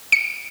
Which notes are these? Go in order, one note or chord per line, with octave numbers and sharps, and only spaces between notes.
C#7